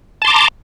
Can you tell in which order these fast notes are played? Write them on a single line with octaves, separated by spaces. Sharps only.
A5 C6 D6 A#5